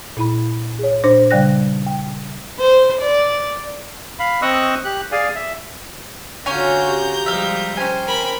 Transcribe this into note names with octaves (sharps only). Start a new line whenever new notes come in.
A#2 E4 B5
G#4 C#5
A#2 D4 C5 D6 A#6
C#3 G3 D5 G5 F#6 A#6
G5
C5
D5
F5 B5
C4 D#5 C#6 D#6 E6 F#6
G4 F#6
G#4 D5 F5 G#5
E5
D3 C#4 F4 F#4 C#5 G#5 A#5 G6
G4
F3 G3 G#3 E5 F5
C#4 C5 G5 G#5
A#4 B5